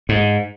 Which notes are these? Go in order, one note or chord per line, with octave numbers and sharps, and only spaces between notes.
G#2